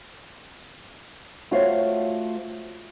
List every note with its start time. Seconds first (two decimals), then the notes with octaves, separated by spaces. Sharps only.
1.51 A3 F4 F#4 C5 C#5 F5